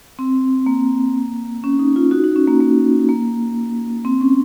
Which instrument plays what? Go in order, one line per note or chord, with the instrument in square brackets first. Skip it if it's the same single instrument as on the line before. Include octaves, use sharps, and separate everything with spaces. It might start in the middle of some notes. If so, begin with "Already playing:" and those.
[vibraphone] C4
A#3
C#4
D#4
F4
D#4 F#4
D#4
C#4
A#3
A#3
A#3
C4
C#4